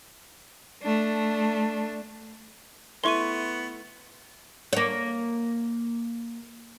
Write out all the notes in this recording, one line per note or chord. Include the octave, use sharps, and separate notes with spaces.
A3 D4
A3 B3 E4 C6 C#6 D#7
A#3 C#5